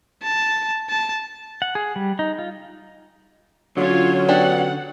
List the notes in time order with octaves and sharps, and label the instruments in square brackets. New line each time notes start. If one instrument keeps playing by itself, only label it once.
[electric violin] A5
A5
[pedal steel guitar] F#5
G#4
G3
D#4
F4
[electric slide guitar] D3 C#4 [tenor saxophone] F#3 [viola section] F4 C#5
[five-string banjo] B3 D4 G4 [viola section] F#5